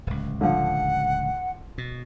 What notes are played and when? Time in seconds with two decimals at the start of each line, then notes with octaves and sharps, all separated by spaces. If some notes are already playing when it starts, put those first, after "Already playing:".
0.07 D1 C#2
0.41 D3 F3 F#5
1.78 B2